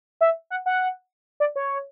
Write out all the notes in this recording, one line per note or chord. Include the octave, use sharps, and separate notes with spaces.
E5
F#5
F#5
D5
C#5